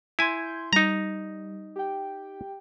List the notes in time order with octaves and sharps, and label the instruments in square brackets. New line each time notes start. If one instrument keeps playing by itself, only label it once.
[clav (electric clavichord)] E4 G#5 [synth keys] C6 G6 G#6
[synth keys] G3 [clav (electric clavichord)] D#4 A#5
[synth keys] G4 G5